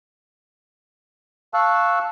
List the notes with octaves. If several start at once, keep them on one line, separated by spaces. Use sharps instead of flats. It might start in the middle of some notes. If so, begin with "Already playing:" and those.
F5 A5 C#6 E6 F#6